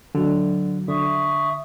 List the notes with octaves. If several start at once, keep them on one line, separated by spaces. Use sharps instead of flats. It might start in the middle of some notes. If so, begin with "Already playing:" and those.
D3 F#3
D3 E5 C#6 D#6